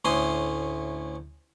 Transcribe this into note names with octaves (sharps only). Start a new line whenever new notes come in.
D2 A2 C#4 C6 D#6